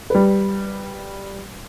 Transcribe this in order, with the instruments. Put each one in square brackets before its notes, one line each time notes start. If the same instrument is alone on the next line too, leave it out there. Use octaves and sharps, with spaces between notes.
[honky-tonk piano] G3 B4